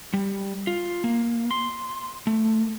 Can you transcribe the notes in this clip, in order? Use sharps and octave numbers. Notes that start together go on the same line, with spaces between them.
G3
F4
A#3
C6
A3